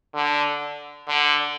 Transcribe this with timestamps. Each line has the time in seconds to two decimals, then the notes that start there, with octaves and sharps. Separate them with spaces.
0.15 D3
1.08 D3